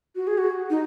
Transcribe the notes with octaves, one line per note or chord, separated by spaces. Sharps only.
F#4
G#4
F#4
D#4